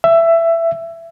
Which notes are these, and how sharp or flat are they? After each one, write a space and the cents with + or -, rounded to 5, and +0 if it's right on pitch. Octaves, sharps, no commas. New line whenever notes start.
E5 +15